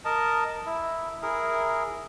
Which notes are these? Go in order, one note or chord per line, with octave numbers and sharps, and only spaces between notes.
A#4 D#5 A5
E4
E4 G#4 A#4